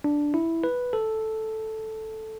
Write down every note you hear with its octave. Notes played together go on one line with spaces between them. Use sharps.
D4
E4
B4
A4